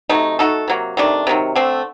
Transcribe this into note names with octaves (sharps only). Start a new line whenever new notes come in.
C3 F#3 A3 D#4
A3 D#4 F#4 A4
C3 F#3 A#3
C3 D#3 A3 D4
C3 D#3 F#3
D3 A3 C4